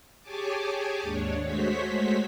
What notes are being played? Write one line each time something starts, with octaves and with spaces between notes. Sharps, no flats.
G4 G#4 C#5 G#5 A5 D6
D#2 G#2 D4 C#5
G#3 A3 F#4 C5 C#5 B6